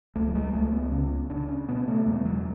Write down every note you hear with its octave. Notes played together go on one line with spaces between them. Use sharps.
C#2 A3
F#3
G#3
C#2 A3
B3
C#3 C#4
C#3 D4
C#4
B2 B3
A3
E2 G#3
F#3